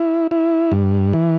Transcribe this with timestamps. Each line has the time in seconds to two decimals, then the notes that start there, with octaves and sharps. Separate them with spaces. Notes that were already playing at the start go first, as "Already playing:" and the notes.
Already playing: E4
0.31 E4
0.72 G2
1.13 E3